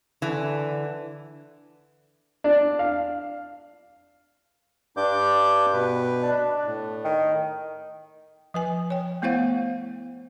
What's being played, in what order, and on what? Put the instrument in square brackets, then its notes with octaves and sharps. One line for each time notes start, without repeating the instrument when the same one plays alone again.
[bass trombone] D3 [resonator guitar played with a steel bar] E3
[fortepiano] D4
F5
[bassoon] G2 [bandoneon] D4 D6 G6
[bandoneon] B2 B4
[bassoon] D4
[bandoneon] A2
[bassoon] D#3
[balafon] F3 B4 G#5
C#5 G5
A3 B3 E4 C5 F5 F#5